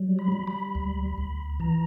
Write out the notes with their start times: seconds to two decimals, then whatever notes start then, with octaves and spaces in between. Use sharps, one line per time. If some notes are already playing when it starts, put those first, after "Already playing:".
Already playing: F#3 G3
0.19 B5
0.32 G3
0.47 B5
0.75 D2
1.18 D2
1.60 E3 A#5